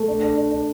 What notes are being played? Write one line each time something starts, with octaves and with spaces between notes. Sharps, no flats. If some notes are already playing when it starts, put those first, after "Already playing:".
Already playing: A3
D4
D4
D4
D4